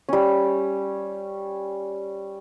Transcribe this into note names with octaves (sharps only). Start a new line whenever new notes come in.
G3 C#4